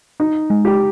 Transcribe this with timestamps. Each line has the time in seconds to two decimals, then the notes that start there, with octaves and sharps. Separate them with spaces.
0.20 D#4
0.50 G#3
0.65 G4